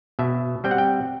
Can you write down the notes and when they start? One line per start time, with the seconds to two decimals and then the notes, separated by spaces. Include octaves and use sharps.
0.19 B2 E5
0.64 G3 C4 G5
0.71 F#5
0.78 G5